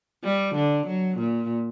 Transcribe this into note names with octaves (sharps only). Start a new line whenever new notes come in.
G3
D3
F#3
A#2